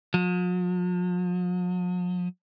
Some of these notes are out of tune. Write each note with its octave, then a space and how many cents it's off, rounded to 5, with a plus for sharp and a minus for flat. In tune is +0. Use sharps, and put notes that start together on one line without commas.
F3 +45